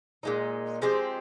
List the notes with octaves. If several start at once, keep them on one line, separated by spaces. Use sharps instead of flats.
A#2 G#3 D#4
F3 G#3 C4 G4